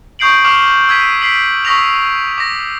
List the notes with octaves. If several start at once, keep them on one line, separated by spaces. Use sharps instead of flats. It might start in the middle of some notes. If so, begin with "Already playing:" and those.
C#6 D#6 G6 C7 D7 F#7
C#6 D6 F6 C7 E7 F#7
E6 G#6 B6 D#7
E6 B6 C7 D7 F#7
C#6 D#6 E6 A#6 B6 F7
D6 A#6